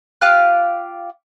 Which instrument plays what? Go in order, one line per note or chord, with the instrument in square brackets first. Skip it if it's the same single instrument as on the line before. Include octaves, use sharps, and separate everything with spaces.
[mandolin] F4 G4 F5 F#6